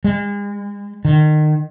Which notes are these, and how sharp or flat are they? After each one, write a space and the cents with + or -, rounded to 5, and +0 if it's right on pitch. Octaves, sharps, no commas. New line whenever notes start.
G#3 -40
D#3 -30